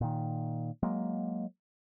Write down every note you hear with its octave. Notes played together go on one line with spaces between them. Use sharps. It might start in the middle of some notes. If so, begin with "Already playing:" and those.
A#2 D#3
F#3 G#3 A#3